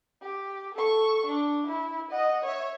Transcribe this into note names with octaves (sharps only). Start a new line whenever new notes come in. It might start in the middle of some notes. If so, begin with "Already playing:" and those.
G4
A4 C#6
D4
E4
D#5 F#5
C#5 E5